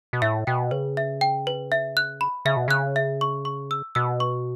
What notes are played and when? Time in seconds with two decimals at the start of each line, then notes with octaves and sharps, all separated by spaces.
0.13 B2
0.22 A2 E5
0.47 B2 G5
0.71 C#3 B4
0.97 E5
1.21 G5
1.47 B4
1.72 E5
1.97 F#6
2.21 B5
2.45 C#3 E5
2.56 B2
2.68 C#3 F#6
2.96 E5
3.21 C#6
3.45 C#6
3.71 E6
3.95 B2 E6
4.20 C#6